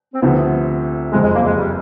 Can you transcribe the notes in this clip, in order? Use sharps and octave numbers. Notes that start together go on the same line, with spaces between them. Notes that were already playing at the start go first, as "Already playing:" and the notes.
C4
D2 C3 F3 B3
F#1 F2 C3 G#3
G#3
A#3
G#3
G3